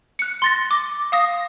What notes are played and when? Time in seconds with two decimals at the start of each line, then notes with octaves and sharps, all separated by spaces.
0.19 F#6 C#7
0.42 C6 A6 A#6
0.71 D6
1.12 F5 D#6 A#6